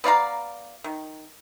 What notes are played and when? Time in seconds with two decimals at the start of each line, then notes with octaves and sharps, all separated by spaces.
0.04 B3 D5 F5 A#5
0.84 D#3